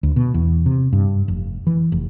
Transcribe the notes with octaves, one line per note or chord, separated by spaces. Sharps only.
D2
B2
E2
C3
G2
F1
E3
F1